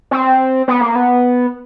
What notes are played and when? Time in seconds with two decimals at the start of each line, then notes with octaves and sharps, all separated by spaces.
0.11 C4
0.68 B3
0.81 A#3
0.96 B3